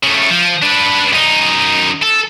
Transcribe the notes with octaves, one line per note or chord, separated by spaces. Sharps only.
C#3 A3
F3
D4 B4
F#2 D#4
A4